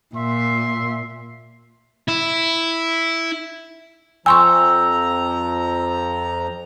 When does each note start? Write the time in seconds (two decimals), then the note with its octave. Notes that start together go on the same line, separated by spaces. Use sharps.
0.16 A#2 E5 C6
2.09 E4
4.26 F2 F3 G5 G#5 A#5 C6 C#6 E6